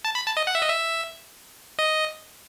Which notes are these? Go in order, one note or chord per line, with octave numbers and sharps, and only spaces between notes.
A5
B5
A5
D#5
F#5
E5
D#5
E5
D#5